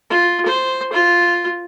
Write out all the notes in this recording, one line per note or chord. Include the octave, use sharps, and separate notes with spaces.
F4
C5
F4